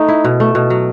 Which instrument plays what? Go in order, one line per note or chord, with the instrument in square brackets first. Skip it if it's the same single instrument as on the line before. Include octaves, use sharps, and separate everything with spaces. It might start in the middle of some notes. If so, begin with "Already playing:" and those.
Already playing: [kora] A3 [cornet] D#4
[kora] E4
B2
A3
B2
F#3